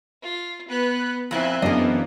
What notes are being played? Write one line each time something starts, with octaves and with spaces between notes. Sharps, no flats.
F4
B3 B4 F#6
F2 A#2 C4 E4 E5 G#5 F#6
F#2 E3 A#3 B3 D4 G#4 D#5